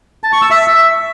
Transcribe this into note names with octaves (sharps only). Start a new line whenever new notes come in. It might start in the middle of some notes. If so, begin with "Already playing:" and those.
A5
C#6
E6
E5